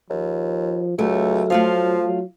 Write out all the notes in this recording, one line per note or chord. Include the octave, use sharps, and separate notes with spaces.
D#2 F3
C#2 F#3 A3
F3 A3 F4 F5
F#3